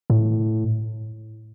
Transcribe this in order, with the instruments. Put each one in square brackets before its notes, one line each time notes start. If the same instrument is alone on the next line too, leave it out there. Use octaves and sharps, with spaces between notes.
[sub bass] A2